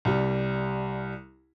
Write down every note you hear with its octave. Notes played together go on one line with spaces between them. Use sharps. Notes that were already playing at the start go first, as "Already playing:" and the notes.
C2 G3